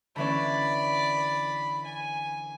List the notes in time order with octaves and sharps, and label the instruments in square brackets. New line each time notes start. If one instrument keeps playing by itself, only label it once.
[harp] D3 E3 C#4 [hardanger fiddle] D5 B5
[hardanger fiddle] G#5